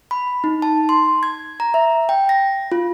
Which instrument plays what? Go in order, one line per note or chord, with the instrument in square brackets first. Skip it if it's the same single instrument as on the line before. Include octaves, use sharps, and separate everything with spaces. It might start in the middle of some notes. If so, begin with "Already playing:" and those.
[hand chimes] B5
D#4
A5
C6
G#6
A#5
E5
G5
A#6
F4